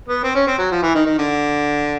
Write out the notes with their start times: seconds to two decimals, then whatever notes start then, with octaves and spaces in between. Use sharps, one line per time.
0.08 B3
0.23 C4
0.35 C#4
0.47 C4
0.58 F#3
0.71 F3
0.82 E3
0.94 D#3
1.06 D#3
1.19 D3